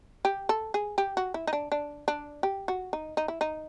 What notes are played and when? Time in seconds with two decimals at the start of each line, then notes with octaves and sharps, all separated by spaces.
0.25 G4
0.49 A4
0.74 G#4
0.98 G4
1.17 F#4
1.34 E4
1.47 D#4
1.53 D4
1.72 D4
2.08 D4
2.43 G4
2.68 F#4
2.93 D#4
3.17 D#4
3.28 E4
3.41 D#4